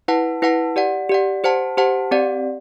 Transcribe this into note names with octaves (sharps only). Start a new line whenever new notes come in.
E4 B4 F#5 A5
E4 B4 F#5 A5
G4 D5 F#5
G4 D5 F#5
G4 C5 F#5 A5
G4 C5 F#5 A5
C4 G4 D5 F#5